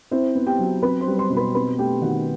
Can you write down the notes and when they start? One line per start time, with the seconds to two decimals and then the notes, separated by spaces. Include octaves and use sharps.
0.11 C4 E4 C5
0.35 B3
0.46 G4 G5
0.59 F#3
0.82 C4 B4 B5
1.01 C5 C6
1.07 G3
1.18 C5 C6
1.30 B2
1.37 B4 B5
1.55 C4 B4 B5
1.78 A3 G4 G5
2.02 D#3 F#4 F#5